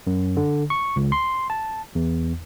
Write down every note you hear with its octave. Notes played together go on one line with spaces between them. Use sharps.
F#2
D3
C#6
C#2
C6
A5
E2